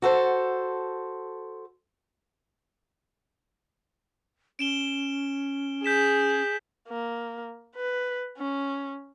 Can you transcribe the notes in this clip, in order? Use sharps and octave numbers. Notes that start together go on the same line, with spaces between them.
F#4 A4 C5
C#4 D7 E7 G7
G#4 G6 B6 E7
A#3
B4
C#4